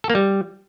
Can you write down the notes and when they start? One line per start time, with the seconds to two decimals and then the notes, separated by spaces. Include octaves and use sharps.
0.04 A4
0.10 A#3
0.15 G3